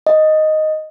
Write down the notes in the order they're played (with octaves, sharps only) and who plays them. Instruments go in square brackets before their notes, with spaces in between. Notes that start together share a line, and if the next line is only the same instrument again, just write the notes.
[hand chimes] D#5